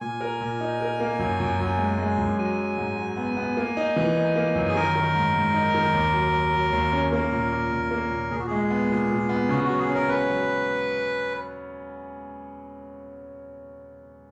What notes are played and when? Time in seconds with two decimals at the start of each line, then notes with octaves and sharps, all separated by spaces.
0.01 A#2 G#5
0.21 A#4
0.41 A#2
0.61 D#4
0.81 A#4
1.00 A#3
1.19 F#2
1.40 F#2
1.59 F#2
1.78 G#3
1.98 G#3
2.18 F#2
2.38 F#3 G#5
2.58 F#3
2.77 G#2
2.97 F#3
3.17 B3
3.37 B3
3.57 A#3
3.77 D#4
3.96 E3
4.16 D#4
4.36 A#3
4.55 F#2
4.68 G#4
4.75 D#3 A#4
4.95 D#3
5.15 G#2
5.34 G#2
5.54 D#4
5.74 D#3
5.94 D#2
6.13 F#3
6.33 F#3
6.53 F#3
6.73 D#2
6.92 C#4
7.12 A#3 A#4
7.32 A#2
7.52 A#2
7.72 A#2
7.91 A#3
8.11 A#2
8.31 A#2 G#4
8.39 F#4
8.47 G#3 G#4
8.70 B3
8.91 A#2
9.09 A#2
9.29 B3
9.49 C#3 F#4
9.64 F#3 F#4
9.78 G#4
9.90 C#4 A#4
10.08 C#4 B4
10.28 F#3